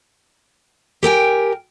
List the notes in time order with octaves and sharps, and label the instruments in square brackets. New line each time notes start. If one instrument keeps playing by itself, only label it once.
[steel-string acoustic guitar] G4 A#4 G5 G#5